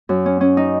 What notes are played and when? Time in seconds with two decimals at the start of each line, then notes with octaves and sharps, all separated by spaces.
0.09 F#2
0.26 C#4
0.41 C#4
0.57 D#4